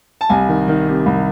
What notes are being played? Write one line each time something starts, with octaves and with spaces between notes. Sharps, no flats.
A5
C2 G#5
D#3
D#3
C3
C2